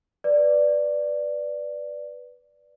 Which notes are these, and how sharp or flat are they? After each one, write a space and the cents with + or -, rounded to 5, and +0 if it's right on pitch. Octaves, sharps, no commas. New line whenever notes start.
B4 +0 D5 +0